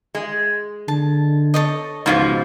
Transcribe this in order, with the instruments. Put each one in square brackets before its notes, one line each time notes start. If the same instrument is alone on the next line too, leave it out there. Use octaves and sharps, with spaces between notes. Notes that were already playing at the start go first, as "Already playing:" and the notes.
[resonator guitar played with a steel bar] G#3
[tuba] D3 [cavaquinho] A5
[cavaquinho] A4 C#5 D#5
[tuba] C#2 [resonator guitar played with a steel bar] G#2 B2 F3 [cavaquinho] F4 C#6